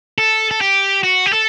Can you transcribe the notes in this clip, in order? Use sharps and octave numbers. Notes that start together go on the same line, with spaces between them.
A4
A4
G4
F#4
G4
A4